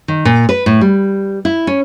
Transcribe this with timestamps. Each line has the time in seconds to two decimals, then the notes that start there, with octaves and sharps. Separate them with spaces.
0.08 D#3
0.25 A#2
0.49 B4
0.66 A2
0.81 G3
1.45 E4
1.67 C#4